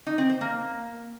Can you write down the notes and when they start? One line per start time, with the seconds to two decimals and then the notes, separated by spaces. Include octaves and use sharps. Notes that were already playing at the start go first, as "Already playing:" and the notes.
0.07 D#4
0.18 C4
0.30 C5
0.41 A#3